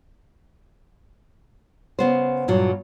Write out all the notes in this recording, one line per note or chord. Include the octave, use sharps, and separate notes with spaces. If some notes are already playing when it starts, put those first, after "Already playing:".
C#3 B3 C5
G2 A#2 F#3